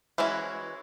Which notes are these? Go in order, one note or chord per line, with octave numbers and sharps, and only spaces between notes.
E3 G#3 C#4 E4 F#4